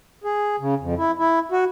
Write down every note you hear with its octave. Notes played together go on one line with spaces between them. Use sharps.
G#4
C#3
F2
E4
E4
F#4